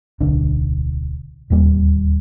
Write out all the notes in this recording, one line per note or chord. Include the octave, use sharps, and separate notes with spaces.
D1 B1 D3 D4
D1 D#2 G3 A#3